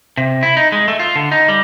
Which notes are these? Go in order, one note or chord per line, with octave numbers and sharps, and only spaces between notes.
C3
E4
D#4
G#3
A3
F4
D3
D#4
G3